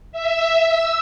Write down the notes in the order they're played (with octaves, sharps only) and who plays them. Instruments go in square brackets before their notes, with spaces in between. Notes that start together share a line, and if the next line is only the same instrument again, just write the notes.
[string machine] E5
E6